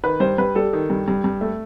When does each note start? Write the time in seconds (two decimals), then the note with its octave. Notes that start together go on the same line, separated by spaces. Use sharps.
0.04 D#3 B4
0.20 G2 C5
0.38 G2 B4
0.55 G3 A4
0.73 D#3
0.90 G2
1.08 G2
1.24 G2
1.41 A3